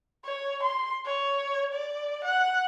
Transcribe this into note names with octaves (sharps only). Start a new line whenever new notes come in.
C#5
C6
C#5
D5
F#5